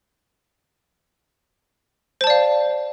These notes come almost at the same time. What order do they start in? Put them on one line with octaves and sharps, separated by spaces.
C5 A5 D5 F5